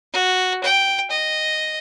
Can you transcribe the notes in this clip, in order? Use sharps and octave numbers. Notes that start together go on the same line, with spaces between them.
F#4
G5
D#5